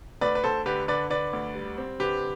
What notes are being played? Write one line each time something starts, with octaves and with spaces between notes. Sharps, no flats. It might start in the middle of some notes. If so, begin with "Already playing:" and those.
D2 B4 D5
B4
D2 A4 C5
D3 G4 B4
D3 B4 D5
D3 B4 D5
D2
G3
C4
D3 G4 B4